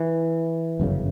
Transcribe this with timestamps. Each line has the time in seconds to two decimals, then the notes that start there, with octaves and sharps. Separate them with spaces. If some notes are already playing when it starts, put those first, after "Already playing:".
Already playing: E3
0.80 G1 F#2 C#3